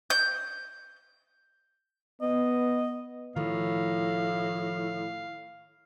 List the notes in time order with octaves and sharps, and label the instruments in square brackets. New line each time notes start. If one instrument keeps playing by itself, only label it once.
[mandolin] G6
[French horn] B3 [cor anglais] D#5
[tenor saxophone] A2 [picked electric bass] D#3 F3 [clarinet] F5